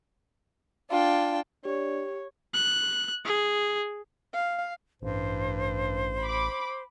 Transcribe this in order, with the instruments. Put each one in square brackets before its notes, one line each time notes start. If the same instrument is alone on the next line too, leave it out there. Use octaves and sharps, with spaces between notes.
[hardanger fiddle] D4 G5 [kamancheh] F4
[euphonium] D4 [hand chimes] G4 [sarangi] C#5
[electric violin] F#6
G#4
[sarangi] F5
[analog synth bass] A1 [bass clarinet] G2 [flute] C5
[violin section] B5 D6